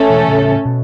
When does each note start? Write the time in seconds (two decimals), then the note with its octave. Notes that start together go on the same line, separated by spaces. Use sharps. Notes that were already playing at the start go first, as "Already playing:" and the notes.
Already playing: A3 C#4 A4
0.10 B2 E3
0.28 A2 C#3
0.65 B2